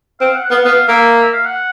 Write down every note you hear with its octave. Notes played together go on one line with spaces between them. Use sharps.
C4 F5
F#5
F#5
B3 F5
F#5
B3 F5
A#3 E5
E5
F5
F#5